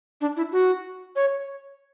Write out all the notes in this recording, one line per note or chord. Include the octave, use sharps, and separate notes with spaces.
D4
E4
F#4
C#5